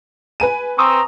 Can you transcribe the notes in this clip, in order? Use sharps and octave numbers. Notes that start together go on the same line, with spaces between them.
B4 G#5 D#7
C4 A#5 C#6 D#6 E6